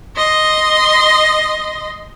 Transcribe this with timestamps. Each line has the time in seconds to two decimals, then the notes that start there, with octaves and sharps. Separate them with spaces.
0.16 D#5 C6